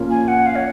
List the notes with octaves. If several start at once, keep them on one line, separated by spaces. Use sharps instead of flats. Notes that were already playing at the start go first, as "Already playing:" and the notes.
Already playing: A#2 F3 A#3 C#4 F4
G#5
F#5
F5
C#5